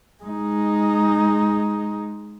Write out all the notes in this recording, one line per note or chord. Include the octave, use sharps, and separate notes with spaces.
G#3 D#4